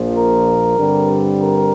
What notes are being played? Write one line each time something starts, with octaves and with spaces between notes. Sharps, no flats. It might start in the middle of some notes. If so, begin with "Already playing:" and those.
Already playing: A#1 A#2 F3
A#4
G2 D3 G3 C4
A#4